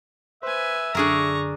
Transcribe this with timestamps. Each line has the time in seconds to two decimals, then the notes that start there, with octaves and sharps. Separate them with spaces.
0.43 B4 C5 E5 G#5
0.95 F#2 D3 D4 G#4 A#4 A#5 C#6